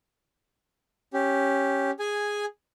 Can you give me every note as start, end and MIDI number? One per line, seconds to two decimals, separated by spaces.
1.14 1.91 61
1.14 1.91 67
1.99 2.45 68
1.99 2.45 80